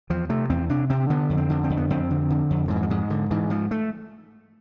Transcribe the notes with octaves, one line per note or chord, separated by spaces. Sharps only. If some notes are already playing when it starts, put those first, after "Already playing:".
E2 F3
C3 A3
E2 C4
C3 D4
C3 C4
D3 B3
F2
C4
D3
C4
F2
B3
F2 C4
D3
D3
F2
G#2 D3
E3
F3
G#2 G#3
G#2 D3
G#2 E3
G#2 F3
A3